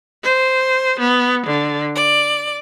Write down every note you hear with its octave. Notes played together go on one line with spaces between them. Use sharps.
C5
B3
D3
D5